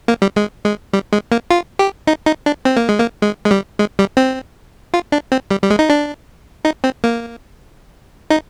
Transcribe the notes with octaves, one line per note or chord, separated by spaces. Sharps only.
A#3
G3
G#3
G#3
G3
G#3
A#3
F4
G4
D#4
D#4
D4
C4
A#3
G#3
A#3
G#3
G#3
G3
G#3
G3
C4
F4
D4
C4
G3
G3
G#3
D#4
D4
D#4
C4
A#3
D#4